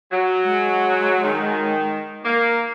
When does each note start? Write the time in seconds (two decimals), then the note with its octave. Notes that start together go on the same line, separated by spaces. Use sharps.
0.12 F#3
0.45 G#3
1.23 D#3
2.24 A#3